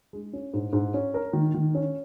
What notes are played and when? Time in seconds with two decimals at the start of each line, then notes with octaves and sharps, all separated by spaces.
0.13 G#3
0.33 C#4
0.54 G#2
0.73 G#2
0.94 C#4
1.14 A#4
1.33 D#3
1.54 D#3
1.75 C#4